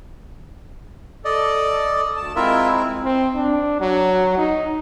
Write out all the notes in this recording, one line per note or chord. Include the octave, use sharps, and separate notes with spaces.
A4 D5 D#5
D2 A5
G#3 C4 E4 F4 A#4 E5
C4
D4
F#3
D#4